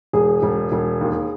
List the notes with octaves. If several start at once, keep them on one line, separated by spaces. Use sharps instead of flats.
E1 G#4
E1
E1
D#2